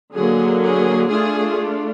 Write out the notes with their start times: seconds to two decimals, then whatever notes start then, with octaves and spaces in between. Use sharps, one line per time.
0.14 D3 F#3 A#3 G#4
0.62 G#4
1.10 A3 D4 F4 G#4